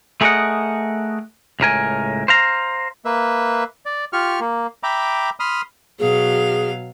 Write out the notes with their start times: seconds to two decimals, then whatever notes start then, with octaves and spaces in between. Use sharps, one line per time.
0.21 A3 G#4 A#4 C#5 D#5 F#5
1.60 C#2 A2 A#4 G#5
2.28 C5 F5 A#5
3.05 A#3 B4 E5
3.86 D5
4.13 F4 G4 C#6 F6
4.40 A#3
4.83 E5 G5 A#5 B5 D6
5.40 B5 C6 D#6 F6
5.99 B2 F#3 G#4 F5